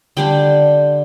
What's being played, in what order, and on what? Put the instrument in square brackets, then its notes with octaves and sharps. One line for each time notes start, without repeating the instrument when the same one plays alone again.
[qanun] D3 G3 D4 G5